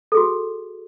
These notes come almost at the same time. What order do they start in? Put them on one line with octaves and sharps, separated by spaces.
A4 G#4 F#4